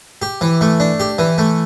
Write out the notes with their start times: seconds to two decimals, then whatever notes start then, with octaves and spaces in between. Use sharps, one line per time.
0.22 G4
0.41 E3
0.61 A3
0.80 D4
1.00 G4
1.19 E3
1.38 A3